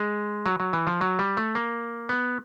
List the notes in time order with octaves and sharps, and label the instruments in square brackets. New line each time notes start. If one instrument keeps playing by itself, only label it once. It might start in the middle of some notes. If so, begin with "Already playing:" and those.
Already playing: [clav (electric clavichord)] G#3
F#3
F#3
E3
F3
F#3
G3
A3
A#3
B3